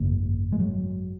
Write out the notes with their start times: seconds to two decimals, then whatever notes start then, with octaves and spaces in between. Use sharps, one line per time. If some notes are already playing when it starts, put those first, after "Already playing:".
Already playing: G#1 F#2 C#3 A#3
0.52 G#3
0.60 F#3